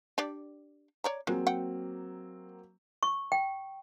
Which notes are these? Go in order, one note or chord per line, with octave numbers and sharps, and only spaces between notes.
D4 G4 D5
C#5 D5 A#5
F#3 G#3 A#3 C4
F#5 G5
C#6
G5